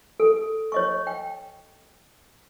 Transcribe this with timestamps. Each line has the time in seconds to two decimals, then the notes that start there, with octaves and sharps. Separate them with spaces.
0.20 A4
0.72 C#5 D#5 C#6
1.07 G5